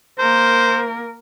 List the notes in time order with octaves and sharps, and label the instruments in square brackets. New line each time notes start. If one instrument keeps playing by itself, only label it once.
[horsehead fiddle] A#3 A#4 [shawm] C5